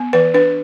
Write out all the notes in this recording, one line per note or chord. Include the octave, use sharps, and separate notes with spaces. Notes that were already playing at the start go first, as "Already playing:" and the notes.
Already playing: B3
E3 B4
D4 B4